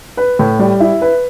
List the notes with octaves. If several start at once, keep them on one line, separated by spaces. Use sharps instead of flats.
B4
A2
G3
E4
B4